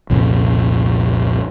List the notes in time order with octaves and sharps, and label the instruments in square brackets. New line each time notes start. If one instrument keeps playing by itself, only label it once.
[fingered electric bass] C2 F2 A#2 C#3